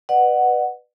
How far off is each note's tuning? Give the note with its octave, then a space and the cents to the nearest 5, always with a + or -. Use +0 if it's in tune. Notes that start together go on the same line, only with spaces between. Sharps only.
B4 +0 D5 +40 F#5 +0